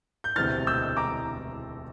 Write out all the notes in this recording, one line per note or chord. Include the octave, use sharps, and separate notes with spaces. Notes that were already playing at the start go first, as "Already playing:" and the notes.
G6
E1 D2 C3 E3 F6 A6
E6 G6
A#5 D6